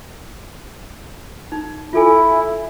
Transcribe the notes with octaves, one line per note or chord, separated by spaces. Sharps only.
D#4
E4 F4 A4 G#5